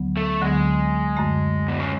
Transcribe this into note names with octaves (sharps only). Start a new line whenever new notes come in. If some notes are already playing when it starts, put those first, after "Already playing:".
Already playing: D2 D3 F#3 B3
A3
D2 D3 F#3 G#3 B3
F#2 D3 A3
B2
C#3